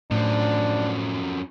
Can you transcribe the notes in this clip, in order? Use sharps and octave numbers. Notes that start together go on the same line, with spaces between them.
F#2 A2 F3 D4